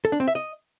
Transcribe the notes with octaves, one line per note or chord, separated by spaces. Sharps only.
A4
D4
C4
E5
D#5